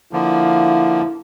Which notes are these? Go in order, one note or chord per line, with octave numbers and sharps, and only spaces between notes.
D3 F3 A#3 E4